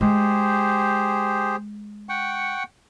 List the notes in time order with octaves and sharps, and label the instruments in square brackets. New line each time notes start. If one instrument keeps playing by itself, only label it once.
[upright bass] G#3 [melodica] G4 G#4 C5
[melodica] F#5 G5 C#6